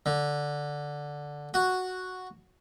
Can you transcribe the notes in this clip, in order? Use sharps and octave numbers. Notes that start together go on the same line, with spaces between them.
D3
F#4